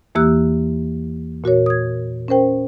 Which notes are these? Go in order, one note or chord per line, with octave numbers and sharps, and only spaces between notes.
E2 E3 A#3 G4 E6 F#6
A#2 F#4 A#4 C#5
D#6 G#6
C#4 A#4 C5 G5